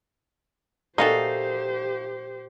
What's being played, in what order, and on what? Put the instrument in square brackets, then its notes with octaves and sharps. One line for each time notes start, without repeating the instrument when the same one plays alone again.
[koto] A#2 F#4 A4 [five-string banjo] D#4 [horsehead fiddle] G4 C5 [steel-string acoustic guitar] F5